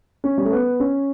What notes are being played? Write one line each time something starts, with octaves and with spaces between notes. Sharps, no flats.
C#4
G3
A3
B3
C#4